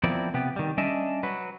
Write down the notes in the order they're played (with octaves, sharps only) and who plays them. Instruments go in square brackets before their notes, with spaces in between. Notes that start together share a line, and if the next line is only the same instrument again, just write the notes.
[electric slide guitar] F3 B3 C4 E4 A#4 D5
C3 B3 G4
D#3 G3
G3 C#4 D4 D#5 E5
F#3 B4